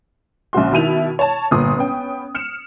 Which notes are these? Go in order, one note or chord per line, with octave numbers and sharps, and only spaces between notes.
A#1 C#3 F#4 C6
B2 D#3 E4 D#7 F7
C#5 A5
G1 A#2 C6 D#6
B3 C#4 G5
F6 C#7 E7